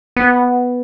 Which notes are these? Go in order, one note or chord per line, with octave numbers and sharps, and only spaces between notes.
B3